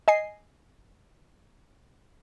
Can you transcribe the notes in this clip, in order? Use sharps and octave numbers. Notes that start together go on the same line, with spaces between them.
D#5 G#5 C7